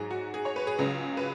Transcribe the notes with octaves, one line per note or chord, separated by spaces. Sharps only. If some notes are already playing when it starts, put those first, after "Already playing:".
Already playing: G#2 F#3 G#4
F#4
G#4
C#5
B4
G#4
C#2 C#3 F#3
B4